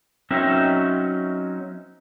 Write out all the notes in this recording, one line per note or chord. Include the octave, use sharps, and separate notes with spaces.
F#3 C4 C#4 D#4 A#4 E5